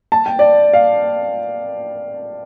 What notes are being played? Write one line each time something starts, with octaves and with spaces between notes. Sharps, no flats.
A5
G5
D5
F5